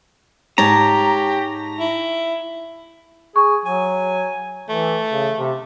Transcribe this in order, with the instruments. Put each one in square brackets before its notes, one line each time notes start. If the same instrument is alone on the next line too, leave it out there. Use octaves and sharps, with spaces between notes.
[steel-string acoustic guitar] G#2 C#5 A5 [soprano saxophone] G4 [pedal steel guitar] A#5
[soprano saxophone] E4
[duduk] G#4 [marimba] C#6
[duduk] F#3 [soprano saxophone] G#5
[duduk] E3 [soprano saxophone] A3
[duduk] C#3
C3